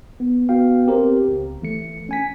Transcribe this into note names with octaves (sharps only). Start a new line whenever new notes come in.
B3
B3 F#4 F5 G5
C4 G4 A#4 C5
C#2
E3 A3 C#7
C#4 G#5 B6